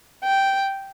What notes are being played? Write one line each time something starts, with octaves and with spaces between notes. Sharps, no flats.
G5